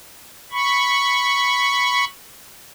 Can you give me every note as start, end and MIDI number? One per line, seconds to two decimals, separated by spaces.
0.52 2.05 83
0.52 2.05 85